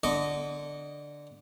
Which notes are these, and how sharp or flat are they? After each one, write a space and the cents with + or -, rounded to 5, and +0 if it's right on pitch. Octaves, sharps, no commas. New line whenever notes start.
D3 +0 D#5 -10 D6 -40